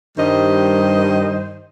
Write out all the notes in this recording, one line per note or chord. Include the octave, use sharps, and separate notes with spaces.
G2 D#3 G3 C5 D#5